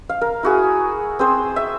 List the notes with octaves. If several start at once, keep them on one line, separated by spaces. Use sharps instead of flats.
F5
A#4
E4 F#4 G#4
C4 G#4 C5
E5